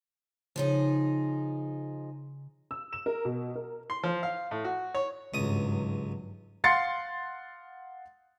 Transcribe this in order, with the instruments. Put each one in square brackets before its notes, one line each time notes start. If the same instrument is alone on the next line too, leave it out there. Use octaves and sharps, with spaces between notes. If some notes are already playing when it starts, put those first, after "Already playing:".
[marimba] C#3 C#5 [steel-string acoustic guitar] F3 D#4 G#4
[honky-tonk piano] E6
E7
A#4
B2
A#4
[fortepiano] C6
F3
F5
A2
F#4
C#5
[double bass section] G#1 G2 F#3 [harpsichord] C#2 D#6
[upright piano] F5 F#5 C6 A6 C7 C#7